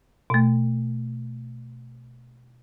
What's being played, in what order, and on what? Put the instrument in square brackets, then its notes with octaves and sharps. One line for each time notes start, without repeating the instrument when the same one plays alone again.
[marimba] B2 A3